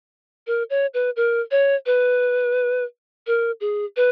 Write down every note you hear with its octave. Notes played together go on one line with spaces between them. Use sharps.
A#4
C#5
B4
A#4
C#5
B4
A#4
G#4
B4